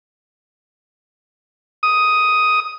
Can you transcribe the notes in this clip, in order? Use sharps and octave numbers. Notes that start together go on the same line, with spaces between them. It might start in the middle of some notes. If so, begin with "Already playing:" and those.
D#6